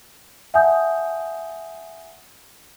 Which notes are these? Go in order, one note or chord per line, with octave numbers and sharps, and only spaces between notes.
E5 F#5 G#5 A5 D#6 G6